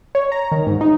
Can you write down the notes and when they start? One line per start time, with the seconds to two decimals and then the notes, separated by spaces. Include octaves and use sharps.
0.15 C#5
0.32 A#5
0.52 D#3
0.67 G#2
0.81 D#4